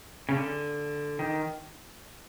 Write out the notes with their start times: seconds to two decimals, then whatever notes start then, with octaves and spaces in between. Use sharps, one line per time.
0.29 C#3
0.36 D3
1.19 D#3